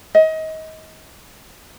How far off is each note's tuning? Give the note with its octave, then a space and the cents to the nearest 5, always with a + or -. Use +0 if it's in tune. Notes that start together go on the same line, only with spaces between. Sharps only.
D#5 +25